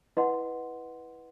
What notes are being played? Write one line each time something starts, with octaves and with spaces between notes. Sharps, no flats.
E4 B4 D#5 F#5 C6